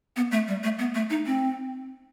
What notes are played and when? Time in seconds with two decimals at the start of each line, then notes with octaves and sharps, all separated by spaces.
0.16 B3
0.31 A3
0.48 G3
0.64 A3
0.79 B3
0.95 A3
1.10 D#4
1.26 C4